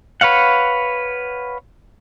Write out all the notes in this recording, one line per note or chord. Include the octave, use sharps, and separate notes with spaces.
B4 C#5 F5 F#5